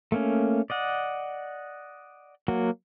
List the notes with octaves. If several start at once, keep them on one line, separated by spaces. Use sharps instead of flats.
A3 A#3 C#4
D5 D#5 F#5
F#3 A#3 F#4